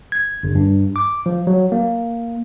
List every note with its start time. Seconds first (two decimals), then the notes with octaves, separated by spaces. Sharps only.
0.12 G#6
0.43 G1
0.55 G2
0.96 D6
1.26 F3
1.47 F#3
1.72 A#3